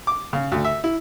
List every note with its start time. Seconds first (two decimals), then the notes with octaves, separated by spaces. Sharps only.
0.07 D6
0.33 C#3
0.52 D2
0.64 E5
0.84 E4